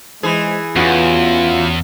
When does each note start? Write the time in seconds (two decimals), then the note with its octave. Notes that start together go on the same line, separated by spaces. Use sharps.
0.23 E3 G#3 G#4 C5
0.76 E2 B3 C#4 F4 F#4